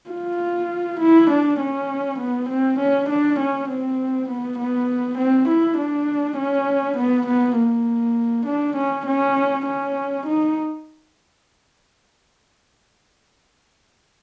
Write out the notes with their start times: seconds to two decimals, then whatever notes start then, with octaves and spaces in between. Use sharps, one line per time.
0.10 F4
1.00 E4
1.30 D4
1.60 C#4
2.19 B3
2.49 C4
2.79 C#4
3.09 D4
3.39 C#4
3.69 C4
4.29 B3
4.59 B3
5.18 C4
5.48 E4
5.78 D4
6.38 C#4
6.97 B3
7.27 B3
7.57 A#3
8.46 D4
8.76 C#4
9.06 C#4
9.66 C#4
10.26 D#4